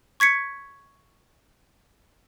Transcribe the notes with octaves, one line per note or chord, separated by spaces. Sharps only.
C#6 G#6 B6 C#7